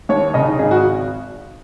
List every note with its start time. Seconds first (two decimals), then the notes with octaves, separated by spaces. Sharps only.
0.09 D#2 C#5
0.34 C#3 D#5
0.46 D#4
0.59 G#1 G#4
0.71 F#4